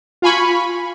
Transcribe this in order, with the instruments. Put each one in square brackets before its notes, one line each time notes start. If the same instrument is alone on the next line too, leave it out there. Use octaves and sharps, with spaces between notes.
[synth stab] F4 F5 G#5 B5 C#6